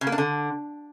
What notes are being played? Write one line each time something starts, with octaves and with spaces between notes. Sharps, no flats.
C#3
A#3
D4
D3